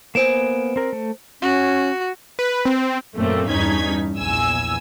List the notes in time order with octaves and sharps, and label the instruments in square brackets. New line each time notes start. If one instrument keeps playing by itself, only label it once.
[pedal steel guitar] A#3 B3 G#5 [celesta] C5 D7 E7
[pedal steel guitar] C4 A#4
A3
[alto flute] C#4 [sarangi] F#4
[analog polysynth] B4
C4
[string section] F#2 A#2 A3 A#3 C4
E2 G2 C#4 D#4 G#6 B6
A#1 E2 G#5 E6